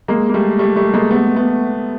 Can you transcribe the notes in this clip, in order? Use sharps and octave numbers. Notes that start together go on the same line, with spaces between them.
G#3 A#3
A#3
G3 A3
G3 A3
G3 A3
G#3 A#3
A3 B3
A3 B3